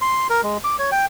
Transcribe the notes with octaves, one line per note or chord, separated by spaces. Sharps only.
C6
A#4
G#3
D6
C#5
G5